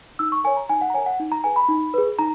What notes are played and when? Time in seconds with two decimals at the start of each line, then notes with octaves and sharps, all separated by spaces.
0.19 D#4 E6
0.32 C#6
0.44 A#4 C#5 G#5
0.57 A#5
0.69 D#4 G#5
0.81 F#5
0.90 A#5
0.94 A#4 C#5 G#5
1.06 F#5
1.20 D#4
1.32 A#5
1.44 G#4 B4 G#5
1.56 B5
1.69 D#4
1.94 G#4 B4
2.19 D#4 A#5